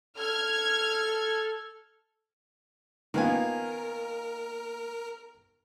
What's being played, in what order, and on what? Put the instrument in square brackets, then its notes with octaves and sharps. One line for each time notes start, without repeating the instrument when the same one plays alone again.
[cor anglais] A4 [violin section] F6 G#6
[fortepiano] D#3 B3 F4 [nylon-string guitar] A#3 F5 G#5 [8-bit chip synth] A#4